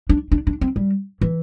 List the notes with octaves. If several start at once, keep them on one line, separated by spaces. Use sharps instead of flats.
D4
D4
D4
C4
G3
E3